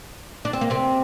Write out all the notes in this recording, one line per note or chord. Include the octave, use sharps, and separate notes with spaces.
D4
C4
A#3
C3 C4